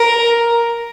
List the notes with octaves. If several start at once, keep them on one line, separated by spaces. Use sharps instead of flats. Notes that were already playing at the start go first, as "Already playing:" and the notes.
Already playing: A#4